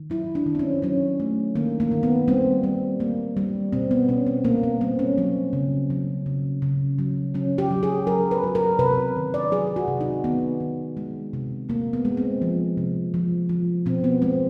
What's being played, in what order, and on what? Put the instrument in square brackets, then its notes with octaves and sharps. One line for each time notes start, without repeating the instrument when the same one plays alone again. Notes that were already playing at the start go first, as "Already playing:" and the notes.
Already playing: [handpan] D#3
F#3 E4
D4
D#3
C4
C#4
F#3 C#4
A3
D#3 A#3
A#3
D#3
B3
G3 C4
G3
A#3
G3
B2 C4
B3
B2 C#4
C4
B2 A#3
B3
G3 C4
C#4
F#3 C4
C#3
F#3
C#3
C#3
F#3
F#3 C#4
G4
F#3
G#4
F#3 A#4
B4
F#3
A#4
C3 B4
D#3
D5
F#3 G#4
F#4
C3
D#4
D#3 B3
D#3
G#3
C3
C3 A#3
B3
G#3
C4
F3
C3
F3
F3
B2 C4
B3
G#3 C4